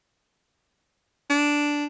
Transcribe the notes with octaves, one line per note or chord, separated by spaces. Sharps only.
D4